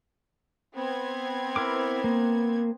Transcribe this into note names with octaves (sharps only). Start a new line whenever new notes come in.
B3 C4 G#6
E4 A#4 D6
A#3